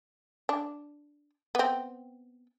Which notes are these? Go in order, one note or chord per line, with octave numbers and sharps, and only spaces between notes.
D4
B3 C4